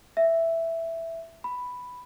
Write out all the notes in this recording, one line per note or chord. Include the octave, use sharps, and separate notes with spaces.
E5
B5